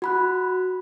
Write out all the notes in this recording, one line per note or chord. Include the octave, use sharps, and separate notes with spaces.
F#4 B5 F#6